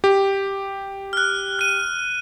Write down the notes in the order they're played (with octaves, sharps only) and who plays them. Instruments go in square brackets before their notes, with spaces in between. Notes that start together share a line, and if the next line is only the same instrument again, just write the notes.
[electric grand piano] G4
[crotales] F6 F#6
F#6 D#7